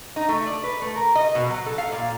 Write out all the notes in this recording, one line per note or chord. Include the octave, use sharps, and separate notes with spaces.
D#4
A3
D5
B4
A3
A#4
D#5
B2
F#3
A4
F5
A#2